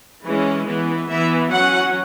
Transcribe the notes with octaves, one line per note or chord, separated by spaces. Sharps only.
E3 G#3 C#4
E3 B3
E3 B3 E5
F#3 C#4 F#5